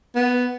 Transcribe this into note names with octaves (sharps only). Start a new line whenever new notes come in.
B3